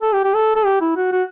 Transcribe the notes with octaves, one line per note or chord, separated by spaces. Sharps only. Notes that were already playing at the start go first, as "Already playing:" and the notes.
A4
G4
G4
A4
A4
G4
E4
F#4
F#4